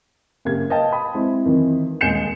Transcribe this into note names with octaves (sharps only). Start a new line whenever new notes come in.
F#1 A#3 G4 G#6
A#4 B4 D#5 F5 G5 A5
B5 D#6
G#3 C4 E4
F2 D#3 E3
D#1 G#3 G#5 G6 C#7 E7